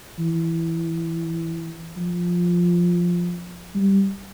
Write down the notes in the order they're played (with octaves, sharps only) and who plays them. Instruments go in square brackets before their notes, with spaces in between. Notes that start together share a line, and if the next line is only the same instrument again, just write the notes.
[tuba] E3
F3
G3